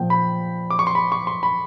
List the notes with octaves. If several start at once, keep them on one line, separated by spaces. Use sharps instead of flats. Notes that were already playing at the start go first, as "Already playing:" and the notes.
Already playing: A#2 F3 A#3 G5
B5
D6
C#6
C6
B5
C#6
C6
B5